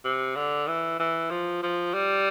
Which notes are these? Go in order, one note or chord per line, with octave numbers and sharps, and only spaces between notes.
C3
D3
E3
E3
F3
F3
G3